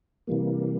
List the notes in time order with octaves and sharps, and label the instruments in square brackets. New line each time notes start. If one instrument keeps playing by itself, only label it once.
[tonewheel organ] C3 E3 G3 A#3